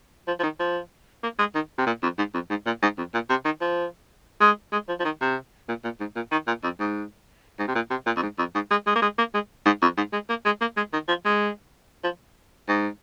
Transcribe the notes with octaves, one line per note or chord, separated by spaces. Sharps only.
F3
F3
D#3
F3
A#3
G#3
D#3
C3
A#2
F2
G#2
F2
G#2
A#2
G#2
F2
A#2
C3
D#3
F3
G#3
G#3
F3
F3
D#3
C3
A#2
A#2
G#2
A#2
D#3
A#2
F2
G#2
G#2
C3
A#2
C3
A#2
F2
G#2
F2
G#2
G#3
G#3
A#3
G#3
A#3
G#3
G#2
F2
G#2
G#3
A#3
G#3
A#3
G#3
D#3
F3
G#3
F3
G#2